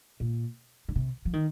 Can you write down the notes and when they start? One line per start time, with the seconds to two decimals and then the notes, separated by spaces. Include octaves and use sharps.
0.20 A#2
0.89 D3
0.95 C3
1.25 F3
1.33 D#3